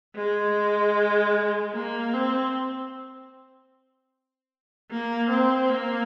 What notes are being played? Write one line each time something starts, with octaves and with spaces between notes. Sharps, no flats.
G#3
A#3
C4
A#3
C4
A#3